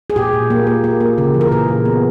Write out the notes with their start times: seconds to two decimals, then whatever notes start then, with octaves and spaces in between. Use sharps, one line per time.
0.10 G#4
0.16 A#2 G4
0.33 A#2
0.50 A#3
0.67 A#3
0.84 A#3
1.00 A#3
1.18 C#3
1.34 E3
1.41 A#4
1.51 A#2 G#4
1.68 A#2
1.85 B3